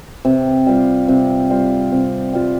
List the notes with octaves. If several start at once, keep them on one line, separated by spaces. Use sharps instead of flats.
C3
G3 F4 C5
C3
G3 F4 C5
C3
G3 F4 C5